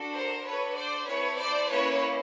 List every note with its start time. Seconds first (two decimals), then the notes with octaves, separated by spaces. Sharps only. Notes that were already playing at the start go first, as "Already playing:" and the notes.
Already playing: D4 F#4 A4
0.14 A#4 C5
0.45 D4 F#4 A4 B4 C#5
0.76 C5 D5
1.07 C4 E4 A4 B4 C#5
1.38 C5 D5
1.69 A#3 C#4 E4 B4 C#5